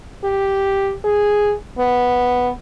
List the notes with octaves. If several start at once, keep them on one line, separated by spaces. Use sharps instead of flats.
G4
G#4
B3